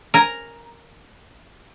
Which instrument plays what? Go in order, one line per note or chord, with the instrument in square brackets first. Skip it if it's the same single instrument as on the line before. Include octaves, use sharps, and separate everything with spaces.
[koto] A#4 G#5 A#5